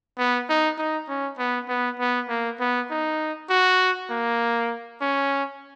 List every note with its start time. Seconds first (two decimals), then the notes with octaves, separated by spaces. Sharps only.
0.18 B3
0.49 D#4
0.78 D#4
1.08 C#4
1.38 B3
1.69 B3
1.99 B3
2.29 A#3
2.60 B3
2.90 D#4
3.49 F#4
4.10 A#3
5.02 C#4